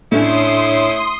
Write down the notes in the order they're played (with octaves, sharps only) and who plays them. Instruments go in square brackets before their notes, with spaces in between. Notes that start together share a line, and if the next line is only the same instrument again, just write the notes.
[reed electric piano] A2 D4 C#5 [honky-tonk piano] A3 C#4 [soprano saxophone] E4 [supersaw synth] C6 D#6